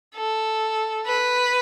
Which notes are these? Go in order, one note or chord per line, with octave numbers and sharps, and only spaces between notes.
A4
B4